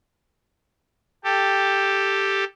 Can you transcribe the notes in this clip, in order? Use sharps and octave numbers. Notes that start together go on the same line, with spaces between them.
G4 A4